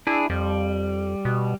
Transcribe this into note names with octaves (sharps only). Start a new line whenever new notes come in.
D4 E4 G#4
F2 G3
B2